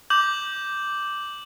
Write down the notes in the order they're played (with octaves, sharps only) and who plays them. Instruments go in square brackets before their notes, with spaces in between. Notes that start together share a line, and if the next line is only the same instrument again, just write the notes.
[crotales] D6 G6 F#7